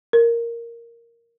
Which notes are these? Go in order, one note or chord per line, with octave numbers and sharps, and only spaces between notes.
A#4